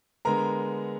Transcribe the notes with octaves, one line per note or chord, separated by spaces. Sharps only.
D3 G#3 B3 A#4 A#5